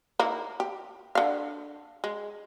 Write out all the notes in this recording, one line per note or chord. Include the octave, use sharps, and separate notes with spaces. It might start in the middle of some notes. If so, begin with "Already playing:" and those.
A#3 D#4 E4
G4
D3 F5
G#3